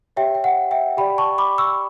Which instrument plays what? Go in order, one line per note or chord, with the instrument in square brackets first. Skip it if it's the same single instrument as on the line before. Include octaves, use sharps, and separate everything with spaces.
[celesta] G4 C#5 E5 G5
G5
F#5
E5 G5
G4 D5 G5 B5
A5 C#6
B5 D6
C#6 E6